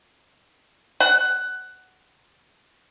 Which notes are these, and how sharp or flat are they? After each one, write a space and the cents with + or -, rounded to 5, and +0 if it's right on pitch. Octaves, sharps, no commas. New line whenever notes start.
F#5 +10